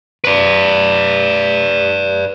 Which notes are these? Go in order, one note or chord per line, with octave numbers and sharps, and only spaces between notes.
B4 D5